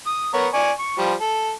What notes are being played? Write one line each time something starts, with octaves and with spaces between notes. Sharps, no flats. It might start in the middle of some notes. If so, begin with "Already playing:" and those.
D#6
B3 A#4 C#5
D5 G#5 C#6
C#6
F3 G3
A4